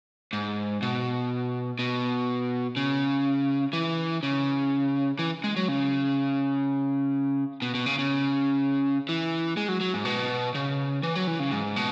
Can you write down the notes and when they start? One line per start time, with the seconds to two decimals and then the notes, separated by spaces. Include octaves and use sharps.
0.33 G#2
0.82 B2
1.79 B2
2.76 C#3
3.73 E3
4.23 C#3
5.19 E3
5.44 G#3
5.56 F#3
5.68 C#3
7.62 B2
7.74 B2
7.86 C#3
7.99 C#3
9.09 E3
9.57 G#3
9.68 F#3
9.81 F#3
9.94 G#2
10.05 B2
10.55 C#3
11.03 E3
11.15 F#3
11.27 E3
11.40 C#3
11.51 G#2
11.76 B2